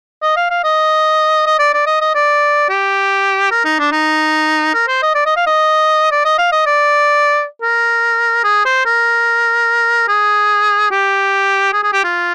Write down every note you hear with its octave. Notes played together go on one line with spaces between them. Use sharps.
D#5
F5
F5
D#5
D#5
D5
D5
D#5
D#5
D5
G4
A#4
D#4
D4
D#4
A#4
C5
D#5
D5
D#5
F5
D#5
D5
D#5
F5
D#5
D5
A#4
G#4
C5
A#4
G#4
G4
G#4
G#4
G4
F4